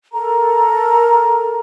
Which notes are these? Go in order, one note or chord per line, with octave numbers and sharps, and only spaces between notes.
A4 A#4 A#5